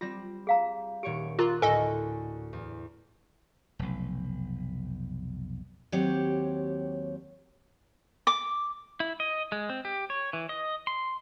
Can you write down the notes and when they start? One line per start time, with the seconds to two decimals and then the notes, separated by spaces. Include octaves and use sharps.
0.01 G3 C4 F4 A#6
0.47 G#4 F5 A#5
1.03 D#1 G4 C#5 D7
1.39 F4 A#4 A#5 D6 F#6
1.62 D2 A2 A4 D#5 G#5
2.53 E2
3.79 F1 B1
5.92 D#2 F#3 C4 G4 C#5
8.27 D6
9.00 E4
9.20 D#5
9.52 G#3
9.69 C4
9.85 G4
10.10 C#5
10.33 E3
10.49 D#5
10.87 C6